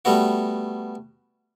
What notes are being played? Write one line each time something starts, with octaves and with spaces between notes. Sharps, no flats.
G3 A3 B3 F#4